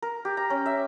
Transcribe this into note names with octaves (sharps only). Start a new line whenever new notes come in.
A#4
G4
A#5
C#4
E5